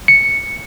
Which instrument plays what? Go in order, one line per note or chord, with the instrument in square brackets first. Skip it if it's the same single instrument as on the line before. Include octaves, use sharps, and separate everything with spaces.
[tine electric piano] C#7